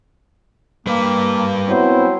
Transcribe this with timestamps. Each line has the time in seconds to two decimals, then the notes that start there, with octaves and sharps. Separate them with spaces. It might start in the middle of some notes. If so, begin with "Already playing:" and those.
0.87 G3 A#3 B4
1.69 F#3 B3 C4 E4 C5